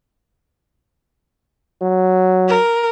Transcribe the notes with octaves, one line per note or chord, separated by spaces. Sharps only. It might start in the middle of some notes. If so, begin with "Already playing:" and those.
F#3
A#4